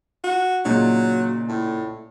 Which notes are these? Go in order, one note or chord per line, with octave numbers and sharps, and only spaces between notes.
F#4
A#2 C#3 F#3 D#4
A2